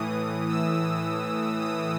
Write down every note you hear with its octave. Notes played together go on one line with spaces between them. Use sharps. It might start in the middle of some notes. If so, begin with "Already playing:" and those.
Already playing: A2 E3 D#6
E6
D#6